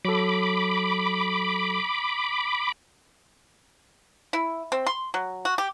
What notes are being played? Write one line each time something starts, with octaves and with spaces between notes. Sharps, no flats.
F#3 A4 B5 D6
E4
C4
C6
F#3
F#4
G4